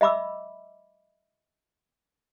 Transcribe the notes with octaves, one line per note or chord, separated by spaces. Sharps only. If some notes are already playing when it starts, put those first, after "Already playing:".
D#5 E5 B5 D6 E6